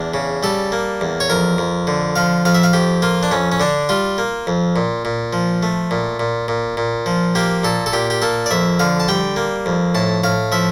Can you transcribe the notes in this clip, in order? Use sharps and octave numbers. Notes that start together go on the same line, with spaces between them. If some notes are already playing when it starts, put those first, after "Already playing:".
Already playing: E2 D4
C#3
G3 A4
A#3
E2
C#5
F2 A#4
F2
D3
F3 F5
F2 F5
E5
F5
F2 G4
A#3 F4
D4
F2 C#4
C#4
D3 D4
G3 F4
A#3
F2
A#2
A#2
F3
A3
A#2
A#2
A#2
A#2
F3
A#3 G4
A#2 A4
A4
A#2 G4
G4
A#3 A4
D5
F2 E5
D3 F5
A5
G3 G5
A#3
F2
A2 A5
A2 F5
F3 E5